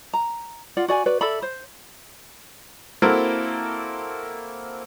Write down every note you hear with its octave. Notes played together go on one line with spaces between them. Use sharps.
A#5
F4 D5 F#5
F#4 D5 G#5
F#4 B4 D5
A4 D5 E5 B5
C5
A#3 C4 E4 F#4 A4 A#4